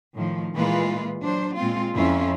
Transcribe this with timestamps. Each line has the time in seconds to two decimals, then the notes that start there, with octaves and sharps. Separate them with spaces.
0.15 A2 D#3 F3
0.54 A#2 E3 G#3 A#3 F4 B4
1.21 F#3 D4 C5
1.57 A#2 G#3 C4 F4
1.95 F2 C#4 E4 F4